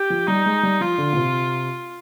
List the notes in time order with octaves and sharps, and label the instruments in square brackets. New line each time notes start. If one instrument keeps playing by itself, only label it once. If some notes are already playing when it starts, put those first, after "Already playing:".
Already playing: [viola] G4
[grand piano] F3
[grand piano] G3 [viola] D#4
[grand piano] G#3
G3
[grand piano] F3 [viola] F4
[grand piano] D3
A#2
C3